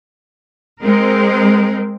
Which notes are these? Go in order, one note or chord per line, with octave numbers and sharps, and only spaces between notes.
G#3 C4 A#4